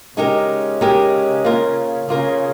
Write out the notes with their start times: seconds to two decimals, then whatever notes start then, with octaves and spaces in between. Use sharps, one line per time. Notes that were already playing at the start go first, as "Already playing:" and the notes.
0.17 C#3 G#3 D#4 G4 A#4
0.81 G#3 D#4 G4 A#4
1.44 A#3 F4 A#4
2.09 C#3 A#3 F4 A#4